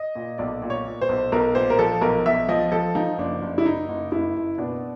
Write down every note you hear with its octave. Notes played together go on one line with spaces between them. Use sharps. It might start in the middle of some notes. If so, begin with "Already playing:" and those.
Already playing: D#5
A#2
B1 D5
A#2
C#5
A#2
C5
B1
B1 A#4
A#2 C5
A#4
F3 A4
B1 A#4
B1 E5
F3 D#5
F3 A4
F3 D#4
F#1 D4
F#1
E4
F#1 D#4
F#1
F#1 E4
F#1
B2 D4